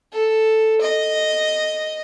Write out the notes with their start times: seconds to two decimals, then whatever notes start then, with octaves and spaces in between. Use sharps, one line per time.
0.12 A4
0.81 D#5